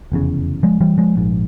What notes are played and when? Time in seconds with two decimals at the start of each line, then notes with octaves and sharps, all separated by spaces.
0.12 F1 E2 C#3
0.63 F3 G#3
0.81 E3 G3
0.98 F3 G#3
1.16 A#1 G#2